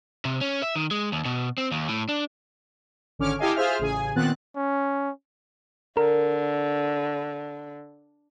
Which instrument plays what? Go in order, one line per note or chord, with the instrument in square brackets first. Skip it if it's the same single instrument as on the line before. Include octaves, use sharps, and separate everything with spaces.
[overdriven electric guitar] C3
C#4
E5
D#3
G#3
D#2
B2
C4
D#2
A2
D4
[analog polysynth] G#1 D3 C#4 C#5 D6 F6
E4 G4 A4 D#5 F5 G#5
F4 G#4 C5 E5 F6
A1 C#3 G#4 G#5
A#2 D#3 B3 C4 F#6 A6
[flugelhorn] C#4
[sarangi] D3 [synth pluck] A#4